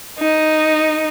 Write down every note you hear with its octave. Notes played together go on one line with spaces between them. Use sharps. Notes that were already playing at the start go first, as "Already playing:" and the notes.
D#4